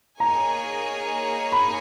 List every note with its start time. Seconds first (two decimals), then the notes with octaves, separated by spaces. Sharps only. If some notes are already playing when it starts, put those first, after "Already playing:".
0.20 A#3 D#4 G#4 C#5 G#5 A#5
1.52 B5